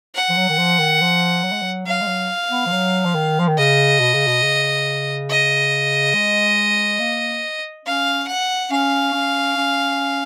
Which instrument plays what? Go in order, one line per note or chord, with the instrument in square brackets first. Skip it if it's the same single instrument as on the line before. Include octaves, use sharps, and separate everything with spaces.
[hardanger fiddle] F#5
[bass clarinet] F3
F#3
D#3
F3
D#3
F3
F#3
G#3
F#3
[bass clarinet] F#3 [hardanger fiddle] F5
[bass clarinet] G#3
F#3
B3
F3
F#3
F3
D#3
F3
D#3
[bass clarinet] C#3 [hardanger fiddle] D#5
[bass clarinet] B2
C#3
B2
C#3
[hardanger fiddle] D#5
[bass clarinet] G#3
A#3
[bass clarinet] C#4 [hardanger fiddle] F5
[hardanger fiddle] F#5
[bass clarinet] C#4 [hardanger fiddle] F5
[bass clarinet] C#4
C#4